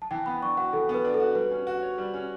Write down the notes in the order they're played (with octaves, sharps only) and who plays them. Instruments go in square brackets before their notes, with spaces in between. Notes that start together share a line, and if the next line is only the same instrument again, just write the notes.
[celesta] A5
[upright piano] E3 [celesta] G5
[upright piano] B3 [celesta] B5
[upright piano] D4 [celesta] C#6
[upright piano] F#4 [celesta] F#5
[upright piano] E3 [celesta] A4
[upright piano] B3
[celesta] B4
[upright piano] D4
[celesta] A4
[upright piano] F#4
[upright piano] G3 [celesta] B4
[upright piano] C#4
F#4
C#5
G3
C#4